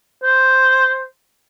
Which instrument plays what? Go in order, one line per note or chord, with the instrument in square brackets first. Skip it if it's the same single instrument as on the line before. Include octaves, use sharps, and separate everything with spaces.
[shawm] C5